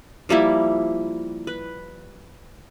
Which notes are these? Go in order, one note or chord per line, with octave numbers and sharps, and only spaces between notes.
F3 G3 A#3 E4
B4